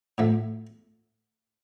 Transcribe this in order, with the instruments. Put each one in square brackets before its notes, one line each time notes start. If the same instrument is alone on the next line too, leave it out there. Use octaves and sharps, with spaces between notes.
[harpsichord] A2 F3 A3